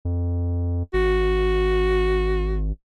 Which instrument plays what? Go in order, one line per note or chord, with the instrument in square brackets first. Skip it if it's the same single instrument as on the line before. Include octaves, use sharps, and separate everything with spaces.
[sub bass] F2
[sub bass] G#1 [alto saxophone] F#4